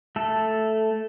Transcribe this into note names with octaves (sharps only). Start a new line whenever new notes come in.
A3 A4